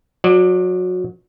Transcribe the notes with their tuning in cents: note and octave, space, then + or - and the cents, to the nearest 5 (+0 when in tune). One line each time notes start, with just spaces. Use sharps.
F#3 -25 D5 +15